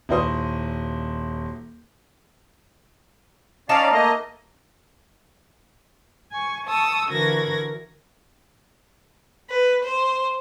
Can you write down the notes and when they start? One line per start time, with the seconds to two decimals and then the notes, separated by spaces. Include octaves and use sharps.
0.09 D#1 E4 F#4 C5 D#6
3.69 C#4 D#4 D5 F5 A5 A#5
3.92 A3 A#3 D#5
6.32 G#5 C#6
6.66 A5 C#6 D#6 E6
7.10 D3 E3 F#4 A#4 G#6 A#6
9.49 B4
9.84 C5